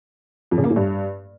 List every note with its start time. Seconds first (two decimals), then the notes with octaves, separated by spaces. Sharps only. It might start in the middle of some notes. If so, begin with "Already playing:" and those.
0.51 F2
0.58 C#3
0.64 A#3
0.70 A2
0.76 G2